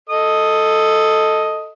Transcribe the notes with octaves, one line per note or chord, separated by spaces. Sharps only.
A4 D#5 D#6